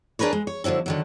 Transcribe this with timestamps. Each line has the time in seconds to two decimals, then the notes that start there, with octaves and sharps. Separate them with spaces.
0.19 D4 G#4 A#4 B4 C#5
0.33 G#3
0.47 C#5
0.64 D3 F3 F#3 C#4 E4
0.86 D3 D#3 F#3